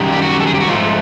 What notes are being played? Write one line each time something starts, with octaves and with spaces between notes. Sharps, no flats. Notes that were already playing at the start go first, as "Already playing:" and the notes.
Already playing: F#2 D#3 G3
G4
F#4
A4
G#4
G4
F#4
G#2 F3 A3 F4